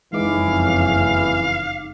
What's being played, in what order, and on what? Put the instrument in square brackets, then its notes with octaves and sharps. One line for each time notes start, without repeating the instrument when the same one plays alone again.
[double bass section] F#1 F2 C#3 [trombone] E3 [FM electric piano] G#3 D#4 D6 [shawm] F5